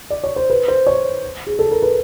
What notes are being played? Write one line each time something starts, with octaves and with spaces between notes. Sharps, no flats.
D5
C#5
C5
B4
C5
C#5
G#4
A4
A#4
B4